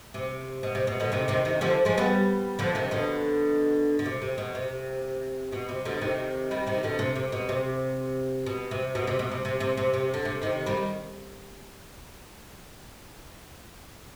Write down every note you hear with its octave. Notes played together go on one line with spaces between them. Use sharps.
C3
B2
C3
B2
B2 D3
C3 D#3
C3 D#3
C3 D#3
D3 F3
F3 G#3
G3 B3
D3 F3
C3 D#3
B2 D3
D3
C3
C3
B2
C3
B2
C3
B2 D3
C3 D#3
D#3 G3
C3 D#3
B2 D3
C3
C3
B2
C3
B2
C3
B2
C3
B2
C3
C3
C3
C3
C3
D3
C3
C3 D#3
D#3 G3